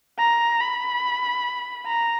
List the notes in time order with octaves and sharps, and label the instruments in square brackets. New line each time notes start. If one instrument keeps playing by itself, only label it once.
[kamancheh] A#5
B5
A#5